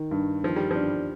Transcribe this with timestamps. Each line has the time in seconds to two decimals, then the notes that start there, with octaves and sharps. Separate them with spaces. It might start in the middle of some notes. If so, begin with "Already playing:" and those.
Already playing: D#3
0.11 G2
0.43 D#3 F3
0.56 G3
0.71 F3 D4